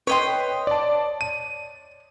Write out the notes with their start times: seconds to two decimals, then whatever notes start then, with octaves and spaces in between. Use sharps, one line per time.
0.07 B4 C#5 D#5 G5 C6
0.67 D5 A5
1.21 D#7